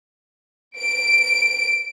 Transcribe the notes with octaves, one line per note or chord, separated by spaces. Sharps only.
D7